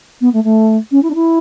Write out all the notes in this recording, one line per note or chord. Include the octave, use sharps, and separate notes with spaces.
B3
A3
A3
C#4
E4
D4
E4